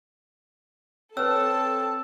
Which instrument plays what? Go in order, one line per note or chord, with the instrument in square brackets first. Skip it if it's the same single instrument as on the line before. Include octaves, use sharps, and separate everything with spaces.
[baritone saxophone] C4 [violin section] A4 A5 [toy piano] B4 C#5 [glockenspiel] E6